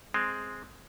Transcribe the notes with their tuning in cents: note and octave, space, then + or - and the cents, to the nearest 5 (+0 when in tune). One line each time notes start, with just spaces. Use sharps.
G#3 +0 C4 +0